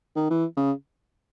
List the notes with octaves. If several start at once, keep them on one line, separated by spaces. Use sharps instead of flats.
D#3
E3
C#3